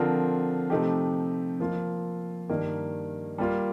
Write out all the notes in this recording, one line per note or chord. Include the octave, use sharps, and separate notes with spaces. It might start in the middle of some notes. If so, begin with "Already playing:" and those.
Already playing: D3 F3 C4 F4 A#4
C3 F3 A3 D#4 G4
F3 A#3 F4
G2 D#3 A#3
G3 A#3 F4